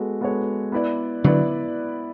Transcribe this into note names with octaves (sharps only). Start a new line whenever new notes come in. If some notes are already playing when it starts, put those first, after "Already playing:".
Already playing: G#3 B3 F#4 A4
G#3 B3 F#4 A4 C#5
B3 E4 B4 D5
D3 F#3 B3 E4 B4 D5